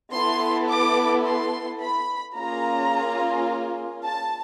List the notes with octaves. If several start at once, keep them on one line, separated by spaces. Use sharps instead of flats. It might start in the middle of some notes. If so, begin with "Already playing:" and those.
B3 E4 A4 C6
D6
C6
B5
A#3 C#4 F4 G#4 A#5
A5